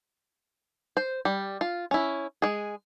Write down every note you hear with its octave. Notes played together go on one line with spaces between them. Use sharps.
C5
G3
F4
C#4 E4
G#3 G#4